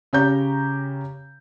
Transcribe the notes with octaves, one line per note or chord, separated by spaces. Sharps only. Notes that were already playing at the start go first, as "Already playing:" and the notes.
C#3 G4 C#5 A#5 G6